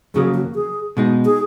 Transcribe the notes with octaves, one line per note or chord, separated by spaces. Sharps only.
F2 C#3 F#3 A#3 G#4
F#4
G#4
B2 G#3 D#4
G#4